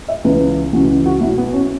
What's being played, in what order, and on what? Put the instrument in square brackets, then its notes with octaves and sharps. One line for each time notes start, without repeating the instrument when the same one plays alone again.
[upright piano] E5
C#2 C#3 E3 B4
C#2 C#3 E3 F#4
F#4
B1 B2 E4
B3
C#4